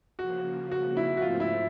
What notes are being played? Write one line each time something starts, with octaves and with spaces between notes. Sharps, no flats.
C#3 F3 A#3 F#4
F#4
E4
F#4
G#2 F3 A3 C4 F4
E4